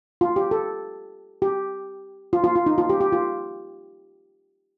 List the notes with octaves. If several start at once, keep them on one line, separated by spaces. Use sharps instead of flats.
F4
G4
A4
G4
F4
F4
F4
D#4
F4
G4
G4
F4